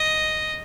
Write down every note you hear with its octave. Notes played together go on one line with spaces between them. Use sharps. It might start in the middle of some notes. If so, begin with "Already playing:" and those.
Already playing: D#5